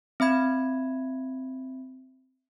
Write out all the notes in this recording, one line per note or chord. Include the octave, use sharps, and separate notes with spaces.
C4 E5 B5 G#6